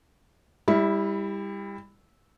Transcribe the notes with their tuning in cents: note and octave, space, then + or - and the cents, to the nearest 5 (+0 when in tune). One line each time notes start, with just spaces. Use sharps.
G3 +25 E4 -10